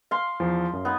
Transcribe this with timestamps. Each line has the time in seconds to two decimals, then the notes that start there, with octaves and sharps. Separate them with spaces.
0.11 F5 C6
0.40 E2 F3
0.73 F#2
0.85 B3 D#4